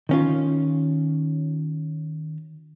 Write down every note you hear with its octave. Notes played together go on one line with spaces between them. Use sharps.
D#3 C#4 F4